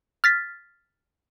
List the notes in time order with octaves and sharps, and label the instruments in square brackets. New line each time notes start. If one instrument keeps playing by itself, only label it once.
[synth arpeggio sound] F6 A6 B6